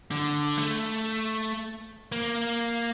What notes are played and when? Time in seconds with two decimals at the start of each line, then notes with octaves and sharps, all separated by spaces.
0.11 D3
0.58 A3
2.12 A#3